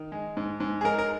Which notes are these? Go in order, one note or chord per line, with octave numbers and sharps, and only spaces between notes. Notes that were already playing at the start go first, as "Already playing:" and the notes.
Already playing: D#3
G#3
G#2
G#2
G#4
G#3 A#4
A#4